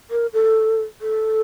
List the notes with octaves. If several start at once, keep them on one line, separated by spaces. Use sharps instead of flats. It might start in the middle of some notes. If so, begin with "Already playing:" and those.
A#4
A4
A4